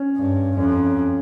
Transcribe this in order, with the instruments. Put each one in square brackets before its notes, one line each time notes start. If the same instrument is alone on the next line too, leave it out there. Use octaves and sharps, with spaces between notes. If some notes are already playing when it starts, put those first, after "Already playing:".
Already playing: [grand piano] C#4
[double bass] G2
[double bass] F2 [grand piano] C#4